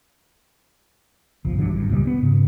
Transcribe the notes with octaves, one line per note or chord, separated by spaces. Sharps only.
F#1 B1 F3
G2 D3 E3 F#3
G#1 G2
C#2 A#2 G3
B3
G#2 C#3